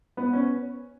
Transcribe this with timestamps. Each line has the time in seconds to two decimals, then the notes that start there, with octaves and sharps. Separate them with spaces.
0.17 B3
0.33 C#4